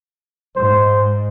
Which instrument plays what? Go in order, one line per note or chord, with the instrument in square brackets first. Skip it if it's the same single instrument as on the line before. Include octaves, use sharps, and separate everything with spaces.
[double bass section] G#2 [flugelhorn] C5